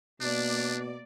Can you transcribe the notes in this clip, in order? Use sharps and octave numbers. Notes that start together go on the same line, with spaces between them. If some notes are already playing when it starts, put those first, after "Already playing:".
B2 A#3 D4 D5